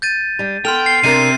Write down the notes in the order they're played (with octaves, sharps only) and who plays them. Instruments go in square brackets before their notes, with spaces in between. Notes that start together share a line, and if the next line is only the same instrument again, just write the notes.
[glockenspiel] G6 A6 D#7
[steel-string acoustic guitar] G3 D4
[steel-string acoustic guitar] B3 A4 [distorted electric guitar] G5 [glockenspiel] C6 F6 F7
[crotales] C7
[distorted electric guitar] C3 [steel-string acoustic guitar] D4 A#4 [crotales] D#7